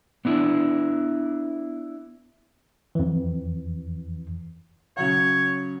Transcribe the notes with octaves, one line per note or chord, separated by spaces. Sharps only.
B3 D4 E4
F2 E3
C#3 F#3 C#5 F#5